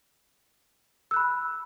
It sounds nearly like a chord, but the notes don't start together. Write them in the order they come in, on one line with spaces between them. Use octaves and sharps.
E6 F#6 B5